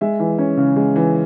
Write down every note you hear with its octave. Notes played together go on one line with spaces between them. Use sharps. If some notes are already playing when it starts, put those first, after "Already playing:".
G#3 E5
E3
C#4
C#3
G#3
E3